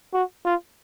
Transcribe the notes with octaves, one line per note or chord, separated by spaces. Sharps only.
F#4
F4